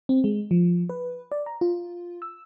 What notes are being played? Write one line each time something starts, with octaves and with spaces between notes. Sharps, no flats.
C4
G#3
F3
B4
D5
A#5
F4
E6